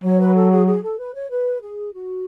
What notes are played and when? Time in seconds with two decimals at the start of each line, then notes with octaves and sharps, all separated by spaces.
0.04 F#3 C#5
0.20 B4
0.35 A4
0.51 G#4
0.67 G#4
0.83 A4
0.99 B4
1.14 C#5
1.30 B4
1.61 G#4
1.94 F#4